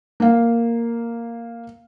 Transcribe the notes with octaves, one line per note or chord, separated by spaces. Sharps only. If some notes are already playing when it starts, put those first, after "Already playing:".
A#3 F5